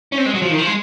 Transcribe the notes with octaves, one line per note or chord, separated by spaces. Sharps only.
C#4
C4
G#3
F#3
F3
D#3
F3
G#3